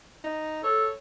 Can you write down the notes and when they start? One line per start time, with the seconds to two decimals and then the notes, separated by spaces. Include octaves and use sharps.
0.24 D#4
0.64 A4 C#5